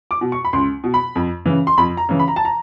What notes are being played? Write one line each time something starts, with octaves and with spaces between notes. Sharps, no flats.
D6
B2
C#6
B5
C#2 C6
B2
B5
F2
C#3 E3
C6
F2 B5
A#5
C#3 E3
B5
A#5
A5
A#5